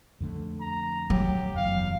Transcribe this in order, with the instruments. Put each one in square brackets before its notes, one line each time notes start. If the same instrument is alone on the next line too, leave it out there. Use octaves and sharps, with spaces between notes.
[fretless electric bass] F2 D3 A3
[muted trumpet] A#5
[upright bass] F#3 [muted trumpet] G4
[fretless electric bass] F#1 E2 [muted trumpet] F5